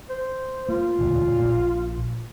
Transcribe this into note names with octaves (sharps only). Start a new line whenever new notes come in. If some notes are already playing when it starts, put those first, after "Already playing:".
C5
A#3 F4
E1 D2 A#2
A#1 A#2